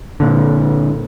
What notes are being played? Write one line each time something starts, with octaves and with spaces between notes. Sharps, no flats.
A#2 D3